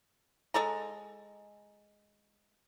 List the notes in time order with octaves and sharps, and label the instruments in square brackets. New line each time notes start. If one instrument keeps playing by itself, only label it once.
[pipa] G#3 A4 A#5